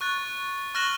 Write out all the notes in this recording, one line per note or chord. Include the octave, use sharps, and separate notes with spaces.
C#6 F#6 A6
C#6 F6 F#6 A#6 E7 F#7